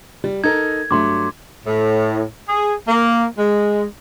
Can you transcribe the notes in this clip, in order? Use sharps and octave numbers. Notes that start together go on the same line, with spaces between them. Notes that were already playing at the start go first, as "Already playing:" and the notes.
G3
D#4 A4 A#4 G#6
G2 F#3 A3 C6 D6
A2
G#4
A#3
G#3